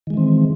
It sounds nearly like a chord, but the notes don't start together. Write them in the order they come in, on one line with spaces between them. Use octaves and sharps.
D#3 G#3 E3 C4